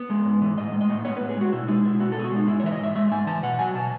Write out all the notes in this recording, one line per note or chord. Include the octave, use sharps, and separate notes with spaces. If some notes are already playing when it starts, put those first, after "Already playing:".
Already playing: B3
G#3
G#2
E3
A2 D#5
G#3
D#5
A2
B3 C#5
B4
A2
G#4
G#3 F#4
B2 E4
G#3 D#4
B2 E4
B3 F#4
A4
B2 G#4
F#4
G#3 D#4
G#2 E4
C#5
E3 E5
D#5
G#2 E5
G#3 E5
G#2 G#5
E3 A5
B2 F#5
F#3 G#5
B2 A5